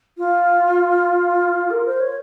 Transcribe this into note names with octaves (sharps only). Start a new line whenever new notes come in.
F4
A#4
C5
C#5